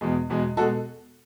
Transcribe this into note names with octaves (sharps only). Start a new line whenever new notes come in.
E2 B2 G#3
E2 B2 G#3
B2 G#3 F#4 A4